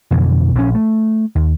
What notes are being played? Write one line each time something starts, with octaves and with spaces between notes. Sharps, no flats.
F2 B2 D3 E3
A#1 E3 C#4
A3
D#2